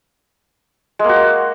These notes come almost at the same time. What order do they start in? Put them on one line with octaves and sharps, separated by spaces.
G#3 A#3 F#4